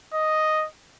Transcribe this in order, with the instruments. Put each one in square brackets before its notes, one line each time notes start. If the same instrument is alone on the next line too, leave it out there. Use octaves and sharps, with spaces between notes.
[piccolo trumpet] D#5